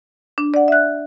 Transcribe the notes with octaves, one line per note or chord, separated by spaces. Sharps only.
D4
D5 F#5
E5 F#6